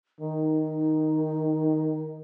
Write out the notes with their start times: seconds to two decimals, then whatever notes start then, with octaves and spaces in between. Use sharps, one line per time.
0.21 D#3 D#4